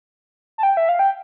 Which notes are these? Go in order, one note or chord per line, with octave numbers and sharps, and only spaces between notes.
A5
G5
E5
F5
G5